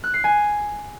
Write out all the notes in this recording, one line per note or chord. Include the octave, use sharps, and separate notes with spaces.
F#6
C7
G#5